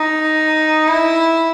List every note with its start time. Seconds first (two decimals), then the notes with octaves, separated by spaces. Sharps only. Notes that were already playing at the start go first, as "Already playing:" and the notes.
Already playing: D#4
0.88 E4